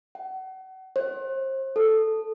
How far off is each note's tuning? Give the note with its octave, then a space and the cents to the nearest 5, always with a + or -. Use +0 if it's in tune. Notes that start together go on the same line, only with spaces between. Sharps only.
F#5 +35
C5 +35
A4 +0